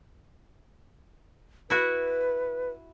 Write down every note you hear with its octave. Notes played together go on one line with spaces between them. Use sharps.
E4 F#4 B4